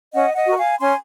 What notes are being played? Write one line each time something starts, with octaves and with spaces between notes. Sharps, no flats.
C#4 D#5 F#5
D#5 F#5
F#4 A#4
F5 G#5
C#4 G#5 C6